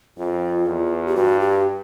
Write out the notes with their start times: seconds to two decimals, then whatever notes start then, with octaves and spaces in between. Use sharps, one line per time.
0.17 F2 F4
0.67 E2
1.06 G4
1.15 G2 F#4
1.40 G4